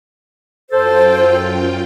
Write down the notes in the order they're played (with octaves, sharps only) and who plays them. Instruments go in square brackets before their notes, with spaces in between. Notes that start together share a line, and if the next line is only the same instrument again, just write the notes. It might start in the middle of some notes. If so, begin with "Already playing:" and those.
[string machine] F#2 F4 G5 [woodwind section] A4 C5